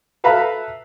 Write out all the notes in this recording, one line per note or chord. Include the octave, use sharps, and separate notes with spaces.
A4 B4 E5 F5 A#5 B5